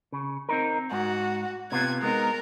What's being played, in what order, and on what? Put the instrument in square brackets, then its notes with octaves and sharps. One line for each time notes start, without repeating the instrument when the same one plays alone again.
[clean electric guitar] C#3
C4 D#4 A#4
[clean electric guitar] G#2 [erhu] F#4
[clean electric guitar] C3 B3 F4 [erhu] G#6
[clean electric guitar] G#3 B3 D#4 [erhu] A#4